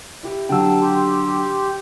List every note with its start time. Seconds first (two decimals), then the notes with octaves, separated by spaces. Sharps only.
0.23 E4 G4
0.49 D3 F#3 G4 G5 A5 E6
0.81 G4 C6